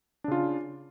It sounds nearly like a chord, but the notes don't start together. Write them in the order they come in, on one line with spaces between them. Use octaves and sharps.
D4 C#3 F4